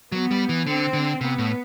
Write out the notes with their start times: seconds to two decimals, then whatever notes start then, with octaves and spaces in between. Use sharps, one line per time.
0.12 F#3 B3
0.31 G3
0.49 E3
0.66 D3 C4
0.93 D3
1.21 C3 B3
1.38 A2